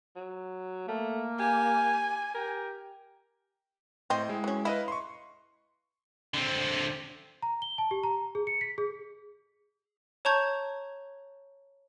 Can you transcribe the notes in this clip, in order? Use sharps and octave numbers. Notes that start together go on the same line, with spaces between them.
F#3
A3 A#3
G4 G#5
G4 A#4
A2 C4 D#5
G#3 E4
F#3 C#4
E4 B4 D#5 F5
C6 C#6
D3 C4
A#5
G7
A5
G4
A#5
G#4
C#7
B6
G#4
C#5 A5 A#5 C#6 G6 G#6